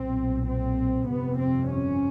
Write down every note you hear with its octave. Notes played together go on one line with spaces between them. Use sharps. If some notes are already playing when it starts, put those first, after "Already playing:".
Already playing: B1 A#2 C4
C4
G1 F2 C3 B3
C4
C#4